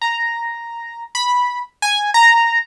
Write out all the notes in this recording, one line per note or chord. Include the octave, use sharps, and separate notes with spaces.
A#5
B5
G#5
A#5